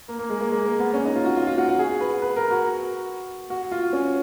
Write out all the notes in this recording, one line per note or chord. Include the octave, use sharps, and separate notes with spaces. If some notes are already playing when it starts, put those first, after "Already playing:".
A#3
A#3
G#3
A#3
G#3
A#3
B3
C#4
D#4
F4
F#4
F4
F4
F#4
F#4
G#4
B4
B4
A#4
F#4
F#4
F4
C#4